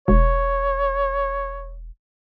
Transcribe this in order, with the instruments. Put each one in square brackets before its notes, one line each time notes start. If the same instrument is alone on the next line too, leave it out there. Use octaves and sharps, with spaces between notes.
[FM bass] E1 [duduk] C#5